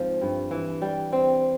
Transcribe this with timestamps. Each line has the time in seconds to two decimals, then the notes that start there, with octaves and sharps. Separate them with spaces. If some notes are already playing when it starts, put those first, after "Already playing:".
Already playing: G#2 F3 C4
0.22 G2
0.51 E3
0.82 G3
1.13 C4